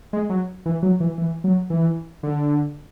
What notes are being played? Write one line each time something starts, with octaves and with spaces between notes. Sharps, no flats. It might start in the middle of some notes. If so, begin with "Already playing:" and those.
G#3
F#3
E3
F#3
E3
E3
F#3
E3
D3